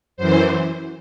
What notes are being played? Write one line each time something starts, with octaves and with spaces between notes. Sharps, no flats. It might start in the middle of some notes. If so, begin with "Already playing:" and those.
F#2 E3 C5